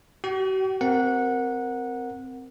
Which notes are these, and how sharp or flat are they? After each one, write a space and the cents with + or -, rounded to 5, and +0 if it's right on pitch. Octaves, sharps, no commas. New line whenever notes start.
F#4 +45 G5 -30
C4 -10 A#4 +0 F#5 -15